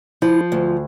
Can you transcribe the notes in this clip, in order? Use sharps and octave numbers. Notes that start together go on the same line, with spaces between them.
F3 E4
D2